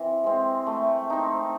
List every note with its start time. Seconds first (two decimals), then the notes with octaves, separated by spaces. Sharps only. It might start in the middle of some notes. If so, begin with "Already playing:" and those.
Already playing: E3 C4
0.24 G#3 C4
0.67 A3
1.10 C4 D#4